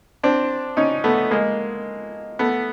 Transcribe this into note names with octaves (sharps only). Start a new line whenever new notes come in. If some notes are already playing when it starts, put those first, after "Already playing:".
C4 D4
C#4 D#4
A3 B3
G#3 A#3
A3 B3